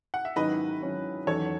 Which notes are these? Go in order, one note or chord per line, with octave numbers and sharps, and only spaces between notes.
F#5
E5
G#2 D#3 F#3 C#4 E4 B4 D#5
G#2 D#3 F#3 C#4 E4
E2 D#3 F#3 C#4 A4 C#5